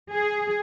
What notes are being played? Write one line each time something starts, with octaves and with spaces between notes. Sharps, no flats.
G#4